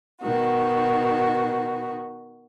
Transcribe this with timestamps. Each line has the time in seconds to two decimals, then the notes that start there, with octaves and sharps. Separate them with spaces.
0.21 B2 D#3 F#4